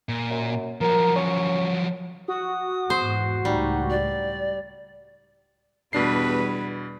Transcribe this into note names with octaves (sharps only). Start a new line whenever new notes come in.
A#2
F#2
F3 F#3 A#4
C#4
F#4 D#6
E2 G#2 C5
C#2 A2 G3 D#4
D5
E2 B2 G3 D4 B4 C7